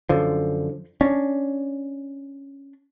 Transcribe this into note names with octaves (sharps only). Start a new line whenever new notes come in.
F#2 D3 F3
C#4 D4